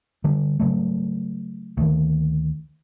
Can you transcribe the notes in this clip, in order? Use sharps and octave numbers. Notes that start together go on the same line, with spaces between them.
D3 G3
C#3 F#3 A3
D2 D#3